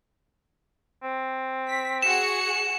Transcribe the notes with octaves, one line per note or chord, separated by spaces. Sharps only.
C4
B6
F#4 G#4 C#7 E7